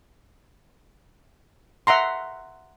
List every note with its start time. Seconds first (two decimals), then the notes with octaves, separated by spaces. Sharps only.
1.87 E5 F#5 A#5 C6